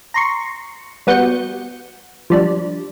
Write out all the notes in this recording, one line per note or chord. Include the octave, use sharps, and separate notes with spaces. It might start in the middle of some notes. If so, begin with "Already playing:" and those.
A#5 C6 C#6
G3 B3 F#4 G6 C#7
F3 G3 D4